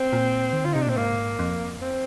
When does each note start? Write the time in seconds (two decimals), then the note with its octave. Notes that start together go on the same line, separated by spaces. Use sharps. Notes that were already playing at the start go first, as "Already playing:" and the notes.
Already playing: C4
0.13 A#2
0.53 D#3
0.64 D3 F4
0.73 C3 D#4
0.81 D4
0.86 A#2 C4
0.97 G#2 A#3
1.39 F2
1.82 C4